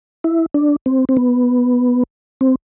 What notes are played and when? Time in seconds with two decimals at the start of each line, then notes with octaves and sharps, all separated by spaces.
0.24 E4
0.54 D4
0.86 C4
1.09 C4
1.17 B3
2.41 C4